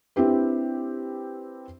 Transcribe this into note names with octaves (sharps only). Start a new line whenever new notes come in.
C4 D4 E4 G4 B4